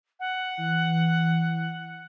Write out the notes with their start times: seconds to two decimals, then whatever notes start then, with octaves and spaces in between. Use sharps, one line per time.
0.20 F#5
0.57 E3